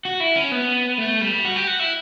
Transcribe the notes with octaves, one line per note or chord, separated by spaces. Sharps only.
F#4
E4
C#4
B3
A3
G3
F#4
G4
F#4
E4